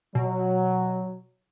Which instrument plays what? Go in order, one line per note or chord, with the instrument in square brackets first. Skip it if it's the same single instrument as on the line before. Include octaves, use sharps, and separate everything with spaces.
[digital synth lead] B2 [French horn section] F#3